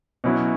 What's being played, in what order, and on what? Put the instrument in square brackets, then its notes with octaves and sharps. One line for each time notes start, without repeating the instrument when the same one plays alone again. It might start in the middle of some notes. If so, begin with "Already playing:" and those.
[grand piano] B2 F#3 C#4 E4